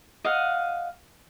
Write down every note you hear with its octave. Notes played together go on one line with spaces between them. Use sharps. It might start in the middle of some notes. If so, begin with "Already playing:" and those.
D#5 F5 F#5